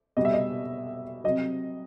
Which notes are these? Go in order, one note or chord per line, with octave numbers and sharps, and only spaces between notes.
B2 G3 D#5
E5
D#5
C3 F#3 D#5